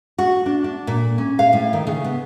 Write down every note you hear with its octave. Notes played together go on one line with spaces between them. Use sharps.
F#4
D4
D4
A#2
C#4
F5
A2
D#3
C#3
B3